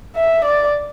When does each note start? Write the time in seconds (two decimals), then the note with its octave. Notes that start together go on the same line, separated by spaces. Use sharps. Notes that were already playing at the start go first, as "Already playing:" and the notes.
0.16 E5
0.45 D5